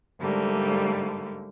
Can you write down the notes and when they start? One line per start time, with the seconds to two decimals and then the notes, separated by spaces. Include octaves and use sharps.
0.20 G#2 D3 G3 A3 A#3